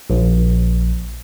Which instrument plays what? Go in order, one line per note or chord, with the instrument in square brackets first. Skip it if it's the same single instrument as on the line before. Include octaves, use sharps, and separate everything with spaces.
[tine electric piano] A#1